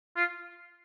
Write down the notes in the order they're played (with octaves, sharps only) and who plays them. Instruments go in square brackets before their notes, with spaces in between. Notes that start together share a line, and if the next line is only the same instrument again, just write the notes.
[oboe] F4